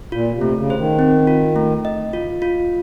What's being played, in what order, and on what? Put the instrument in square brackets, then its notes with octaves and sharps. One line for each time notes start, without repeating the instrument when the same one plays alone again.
[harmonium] A#2 [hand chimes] F4
[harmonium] C3
[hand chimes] A3
[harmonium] C#3
[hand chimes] C5
[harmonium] D#3
[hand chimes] C4
F4
A3
D#5
F4
F4